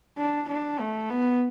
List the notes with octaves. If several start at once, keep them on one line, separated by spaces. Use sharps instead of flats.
D4
D4
A3
B3